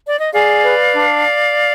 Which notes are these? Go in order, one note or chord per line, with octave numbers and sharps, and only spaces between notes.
D5
D#5
G#4 D5 F5
B4
D4